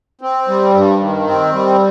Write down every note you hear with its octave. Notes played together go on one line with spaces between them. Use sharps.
C4
G3
G2
D#3
C4
G3